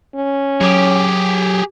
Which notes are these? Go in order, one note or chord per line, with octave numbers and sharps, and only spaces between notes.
C#4
F#3 G4 G#4